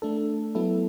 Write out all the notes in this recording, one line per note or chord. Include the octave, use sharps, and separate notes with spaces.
A3 D4 A4
F#3 B3 E4 A4